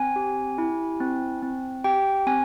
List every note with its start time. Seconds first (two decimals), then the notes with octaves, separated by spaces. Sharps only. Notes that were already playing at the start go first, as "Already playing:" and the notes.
Already playing: C4 G#5
0.16 G4
0.58 E4
1.00 C4
1.43 C4
1.84 G4 G5
2.27 C4 G#5